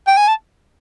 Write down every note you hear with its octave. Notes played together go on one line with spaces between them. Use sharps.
G5
G#5
A5